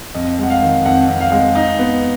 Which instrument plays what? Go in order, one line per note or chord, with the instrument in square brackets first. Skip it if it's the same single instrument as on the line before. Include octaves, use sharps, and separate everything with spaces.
[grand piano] F2 D#5
G#3 F#5
F5
D#3
F2 F#5
F2
F5
G#3
D#4
B3